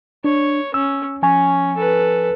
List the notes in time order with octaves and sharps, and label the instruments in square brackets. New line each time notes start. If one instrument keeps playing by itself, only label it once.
[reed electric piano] D4 [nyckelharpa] C#5
[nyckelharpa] C#4 [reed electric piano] E6
[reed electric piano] F3 G#5 C#6 [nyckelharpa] C#4
[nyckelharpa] A4 B4